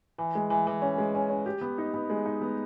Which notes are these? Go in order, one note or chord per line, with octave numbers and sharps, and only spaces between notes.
E3
G#3
E3
E3
C#4
G#3
C#4
C#4
G4
B3
D#4
B3
G#3
D#4
B3